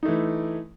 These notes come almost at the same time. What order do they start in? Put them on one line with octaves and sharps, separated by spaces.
D#4 A3 E3